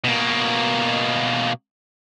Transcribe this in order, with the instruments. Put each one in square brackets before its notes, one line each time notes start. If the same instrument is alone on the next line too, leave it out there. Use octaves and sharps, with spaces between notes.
[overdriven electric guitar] B2 A#3